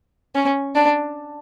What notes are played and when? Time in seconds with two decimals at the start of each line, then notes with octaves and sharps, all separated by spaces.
0.35 C#4
0.75 D4